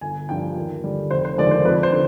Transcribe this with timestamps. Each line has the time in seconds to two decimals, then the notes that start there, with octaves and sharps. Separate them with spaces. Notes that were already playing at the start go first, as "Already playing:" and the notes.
0.01 G1 G#5
0.29 G2 F3 G5
0.57 D#2
0.84 D3 G3
1.11 F1 C5
1.25 C5
1.38 D#2 D3 F3 G#3 D5
1.51 C5
1.65 F2 B4
1.83 C5
1.92 D3